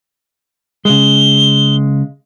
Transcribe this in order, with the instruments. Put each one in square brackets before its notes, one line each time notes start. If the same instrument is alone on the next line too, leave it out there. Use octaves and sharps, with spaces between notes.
[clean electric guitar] C#3 G#3 [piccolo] G7